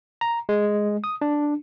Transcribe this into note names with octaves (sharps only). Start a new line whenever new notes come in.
A#5
G#3
D#6
D4